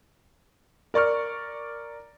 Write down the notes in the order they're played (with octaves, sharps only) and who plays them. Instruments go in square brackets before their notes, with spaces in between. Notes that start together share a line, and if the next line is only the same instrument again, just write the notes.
[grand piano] A#4 D5 C#6 F6